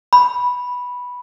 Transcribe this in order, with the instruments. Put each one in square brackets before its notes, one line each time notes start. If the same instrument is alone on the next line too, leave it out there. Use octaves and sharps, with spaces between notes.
[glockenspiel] B5